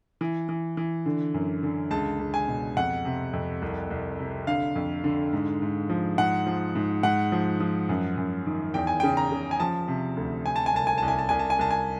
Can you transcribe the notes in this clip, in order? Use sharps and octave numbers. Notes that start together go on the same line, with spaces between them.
E3
E3
E3
D3
F#2
D3
C#2 A5
C#2
G#5
B2
F2 F#5
C3
F2
C2
C2
C3
D3 F5
F2
D3
G#2
G#2
F3
G#2 F#5
F3
G#2
G#2 F#5
F3
F3
F#2
F#2
D#3
E2 G5
G#5
C#3 G5
A#5
C#3
G#5
F3 A5
C3
D2
C3 G#5
A5
G#5
C2 A5
G#5
C2 A5
G#5
A5
C2 G#5
A5
G#5
C2 A5
G#5